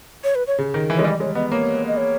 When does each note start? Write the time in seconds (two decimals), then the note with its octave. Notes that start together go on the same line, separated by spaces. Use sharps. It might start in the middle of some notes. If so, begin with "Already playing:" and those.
0.24 C#5
0.35 B4
0.47 C#5
0.59 C#3
0.74 D#3
0.90 E3
0.96 G#3 C#5
1.04 G3 D#5
1.20 G#3 C#5
1.35 B3 D#5
1.50 A#3 C#5
1.88 D#5
1.97 C#5